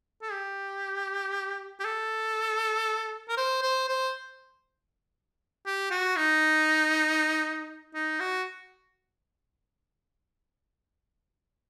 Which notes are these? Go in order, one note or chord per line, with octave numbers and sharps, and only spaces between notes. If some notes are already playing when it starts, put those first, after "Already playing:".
A4
G4
G4
A4
A#4
C5
C5
C5
G4
F#4
D#4
D#4
F#4